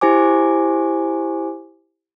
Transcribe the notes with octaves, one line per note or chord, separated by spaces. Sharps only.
E4 G4 C5 G#5 D6